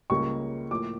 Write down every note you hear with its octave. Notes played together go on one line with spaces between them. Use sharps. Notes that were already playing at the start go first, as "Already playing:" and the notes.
C#2 C#3 G3 A#3 C#6
A2 F3 A#3 D6